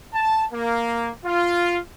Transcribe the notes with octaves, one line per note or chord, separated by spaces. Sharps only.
A5
A#3
F4